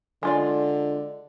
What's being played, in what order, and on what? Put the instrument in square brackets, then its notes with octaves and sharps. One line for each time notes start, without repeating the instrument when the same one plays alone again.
[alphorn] D3 [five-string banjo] G#3 F4 D5